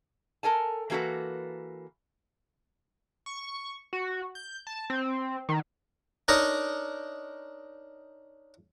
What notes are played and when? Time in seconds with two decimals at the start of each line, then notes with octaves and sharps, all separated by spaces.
0.43 A4 A#4 G#5 A5
0.90 E3 A#3 F#4 A4 B4
3.26 C#6
3.93 F#4
4.35 G6
4.67 A5
4.90 C4
5.49 D#3
6.28 D4 D#4 A#4 C#5 D#5